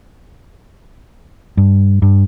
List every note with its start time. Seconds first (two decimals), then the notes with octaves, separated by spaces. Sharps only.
1.57 G2
2.02 G2